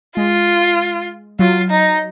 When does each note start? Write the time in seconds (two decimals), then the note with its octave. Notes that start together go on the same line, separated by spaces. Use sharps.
0.16 G#3 F4
1.39 F#3 F4
1.70 D#4